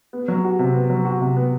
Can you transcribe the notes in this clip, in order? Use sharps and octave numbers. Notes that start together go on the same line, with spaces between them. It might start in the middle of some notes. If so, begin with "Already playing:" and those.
B3
F#3
F#4
C3
B3
F#3
F#4
C3
B3